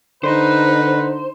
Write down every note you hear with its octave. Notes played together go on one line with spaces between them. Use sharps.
D3 D#4 B4 C5